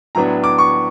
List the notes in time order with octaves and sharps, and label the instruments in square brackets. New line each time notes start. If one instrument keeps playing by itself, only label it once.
[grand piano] A2 F#3 B3 D4 A#5
D6
C#6